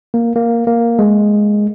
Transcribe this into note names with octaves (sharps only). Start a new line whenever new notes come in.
A#3
A#3
A#3
G#3